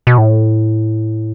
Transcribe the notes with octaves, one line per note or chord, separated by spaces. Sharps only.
B2
A2